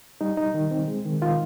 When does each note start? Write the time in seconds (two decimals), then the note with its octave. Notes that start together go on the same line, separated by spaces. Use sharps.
0.21 G3 D#4
0.37 D#4
0.54 D#3
0.71 C4
0.88 G#3
1.05 D#3
1.21 D#3 F4